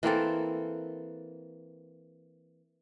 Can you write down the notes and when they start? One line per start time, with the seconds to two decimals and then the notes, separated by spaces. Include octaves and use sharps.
0.03 E3 A#3 C4 A4